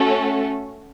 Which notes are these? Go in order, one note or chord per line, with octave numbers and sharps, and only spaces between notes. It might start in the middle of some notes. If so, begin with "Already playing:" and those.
Already playing: A3 C#4 F#4 A4